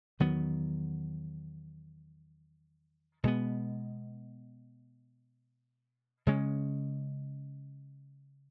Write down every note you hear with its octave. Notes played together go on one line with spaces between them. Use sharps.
E2 D#3 F#3 B3
B2 G#3 B3
C#3 G#3 C#4